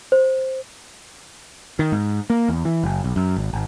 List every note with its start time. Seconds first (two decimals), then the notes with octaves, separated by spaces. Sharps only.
0.12 C5
1.79 D#3
1.92 G#2
2.30 A#3
2.48 E2
2.65 E3
2.83 F#1
3.04 B1
3.16 F#2
3.37 G#1
3.53 G#1